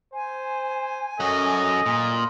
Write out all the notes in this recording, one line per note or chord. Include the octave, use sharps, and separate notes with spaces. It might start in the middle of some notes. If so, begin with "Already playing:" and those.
C5 G#5
F#2 F#4 A4 D#5
A#2